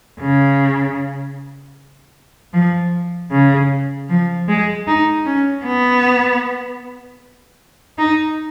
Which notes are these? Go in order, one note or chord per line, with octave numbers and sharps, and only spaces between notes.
C#3
F3
C#3
F3
G#3
D#4
C#4
B3
D#4